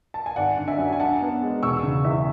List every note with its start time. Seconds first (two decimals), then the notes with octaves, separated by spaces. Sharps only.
0.14 A5
0.26 G#5
0.36 G#1 D5 F#5
0.57 D3
0.68 E5 G#5
0.78 F#2
0.93 G#5
1.00 D4 F#5 A5
1.21 B3
1.42 G#3
1.63 E1 C#6 E6
1.83 C#3
2.04 E2 E5